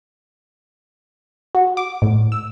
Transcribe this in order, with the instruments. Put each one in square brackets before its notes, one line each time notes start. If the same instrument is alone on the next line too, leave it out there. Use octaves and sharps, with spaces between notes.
[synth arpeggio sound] F#4
D6
A2
E6